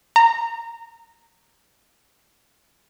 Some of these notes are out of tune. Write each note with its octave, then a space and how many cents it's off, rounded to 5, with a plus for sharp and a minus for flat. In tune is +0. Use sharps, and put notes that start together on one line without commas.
A#5 -15